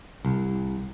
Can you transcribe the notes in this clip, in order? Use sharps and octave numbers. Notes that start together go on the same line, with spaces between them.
C2